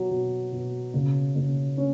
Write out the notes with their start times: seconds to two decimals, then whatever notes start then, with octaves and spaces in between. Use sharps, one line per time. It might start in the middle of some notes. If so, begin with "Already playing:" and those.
Already playing: B2 F#3
0.10 B2
0.52 B2
0.94 C#3
1.35 C#3
1.77 C#4